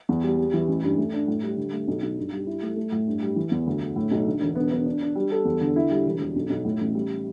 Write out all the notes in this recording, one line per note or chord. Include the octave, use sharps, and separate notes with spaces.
E2
G3
G3
E3
A1
G2
A3
D4
A2
G3
D3
A3
B1
B1
G2
G3
E4
A3
A3
A2
G2
G3
E3
E2
D2
D3
A2
B1
D3
E1
B3
B3
D4
D4
G3
A4
E2
D3
E4
G3
E1
E1
B1
B1
A2
A1
G3